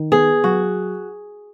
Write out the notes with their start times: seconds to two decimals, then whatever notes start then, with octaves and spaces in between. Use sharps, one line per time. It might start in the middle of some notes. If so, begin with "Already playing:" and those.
Already playing: D#3
0.12 B3 G#4
0.43 F#3 F#4